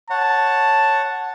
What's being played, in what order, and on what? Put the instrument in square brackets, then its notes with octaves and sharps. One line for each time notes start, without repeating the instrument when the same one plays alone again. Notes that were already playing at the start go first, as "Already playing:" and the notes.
[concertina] C#5 F#5 [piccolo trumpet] A5